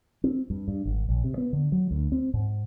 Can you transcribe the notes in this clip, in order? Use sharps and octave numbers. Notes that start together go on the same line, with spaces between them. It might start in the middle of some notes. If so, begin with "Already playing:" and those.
C4
G2
G2
G#1
A#1
C3
B3
D3
F#3
D2
C4
G#2